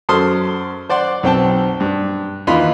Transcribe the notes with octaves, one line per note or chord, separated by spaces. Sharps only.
F#2 A4 C5 C6 D#6 F6
C5 D5 F#5 C6
B1 C4 G5 A5
G2
D#2 E3 D#4 F4 B5 C6